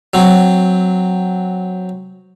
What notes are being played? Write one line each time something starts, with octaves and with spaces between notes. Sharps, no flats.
F#3 C4